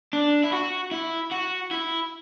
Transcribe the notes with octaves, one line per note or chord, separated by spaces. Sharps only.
D4
E4
F#4
E4
F#4
E4